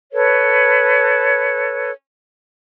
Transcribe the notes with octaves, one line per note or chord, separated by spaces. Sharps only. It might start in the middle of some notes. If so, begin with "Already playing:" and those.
A4 B4 C#5